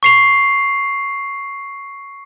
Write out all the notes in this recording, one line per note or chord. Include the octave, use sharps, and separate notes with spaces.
C#6 C7 F7